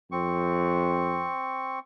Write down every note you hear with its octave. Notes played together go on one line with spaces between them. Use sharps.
F2 C4 C#6